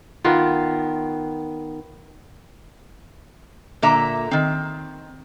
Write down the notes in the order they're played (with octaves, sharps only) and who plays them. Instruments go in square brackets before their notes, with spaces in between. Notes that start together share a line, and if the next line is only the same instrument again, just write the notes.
[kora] D#3 B3 F4
[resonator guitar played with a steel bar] A#2 D3 A#3 E5 A#5
D#3 C4